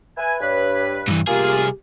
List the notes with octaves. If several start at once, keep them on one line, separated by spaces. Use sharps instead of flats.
B4 E5 G#5
G2 B4 C#5
G2 E3
C2 A#3 F4 G4 G#4